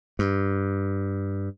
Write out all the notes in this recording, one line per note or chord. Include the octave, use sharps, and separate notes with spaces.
G2